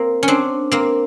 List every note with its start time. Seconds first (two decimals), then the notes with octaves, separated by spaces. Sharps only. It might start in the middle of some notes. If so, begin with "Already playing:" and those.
Already playing: A#3 C4
0.23 C#4
0.28 C4 D4
0.72 A#3 C4